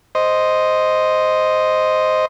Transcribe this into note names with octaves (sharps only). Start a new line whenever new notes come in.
C5 D#5